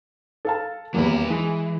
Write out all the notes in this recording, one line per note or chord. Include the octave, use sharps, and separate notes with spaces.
A4 F5 A5
D#1 E2 F#3 A#3 B4
E3 G#3